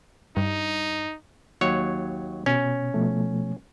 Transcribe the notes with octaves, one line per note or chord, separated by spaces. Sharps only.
G2 D#4
D#2 F#3 C#5
B2 C#4
B2 F3 A3